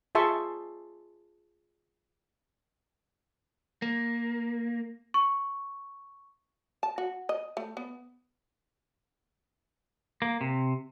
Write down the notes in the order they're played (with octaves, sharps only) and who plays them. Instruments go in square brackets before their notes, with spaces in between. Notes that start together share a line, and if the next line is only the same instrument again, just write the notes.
[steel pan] F4 G#4 E5 A5 C6 C#6
[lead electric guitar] A#3
[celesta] C#6
[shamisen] A5
F#4
D#5
A3
B3
[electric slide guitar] A#3
C3